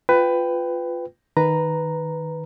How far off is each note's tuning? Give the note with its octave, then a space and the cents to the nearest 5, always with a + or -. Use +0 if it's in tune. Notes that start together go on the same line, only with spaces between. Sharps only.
F4 +0 B4 +15 G5 +0
D#3 +0 B4 +0 A#5 +0